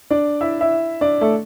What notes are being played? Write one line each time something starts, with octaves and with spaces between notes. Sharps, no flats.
D4 D5
E4 E5
E4 E5
D4 D5
A3 A4